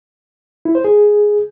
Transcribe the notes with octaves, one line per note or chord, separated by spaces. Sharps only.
E4
C5
G#4